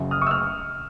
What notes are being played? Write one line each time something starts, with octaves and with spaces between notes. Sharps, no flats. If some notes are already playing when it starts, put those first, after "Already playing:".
Already playing: F#1 F#2 C#3 F#3
D#6 F6
C#6 D#6
E6
F6